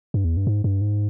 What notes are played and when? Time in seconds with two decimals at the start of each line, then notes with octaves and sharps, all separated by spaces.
0.14 G2
0.25 E2
0.37 G2
0.47 G#2
0.64 G2
0.81 G#2